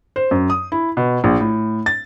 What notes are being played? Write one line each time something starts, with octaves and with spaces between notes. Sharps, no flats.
C5
F#2
D#6
E4
B2
A#1
A2
A6